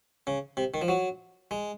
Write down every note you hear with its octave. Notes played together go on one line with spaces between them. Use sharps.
C#3
C3
D#3
F3
F#3
G#3